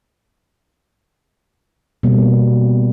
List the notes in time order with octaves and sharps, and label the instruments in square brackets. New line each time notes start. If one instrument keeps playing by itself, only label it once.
[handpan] B2 G3 A#3